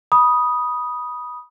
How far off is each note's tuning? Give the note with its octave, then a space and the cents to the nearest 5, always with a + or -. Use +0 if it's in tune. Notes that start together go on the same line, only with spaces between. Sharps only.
B5 -20 D#6 +0